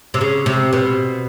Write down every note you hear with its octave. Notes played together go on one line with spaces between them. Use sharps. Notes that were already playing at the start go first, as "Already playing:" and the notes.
C3
C#3
C3
B2